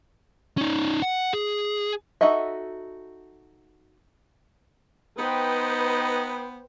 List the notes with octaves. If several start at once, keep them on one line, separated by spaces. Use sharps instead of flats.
C#4 D#4
F#5
G#4
D#4 F#4 A4 D#5 E5
B3 D#4 B4 C5 G5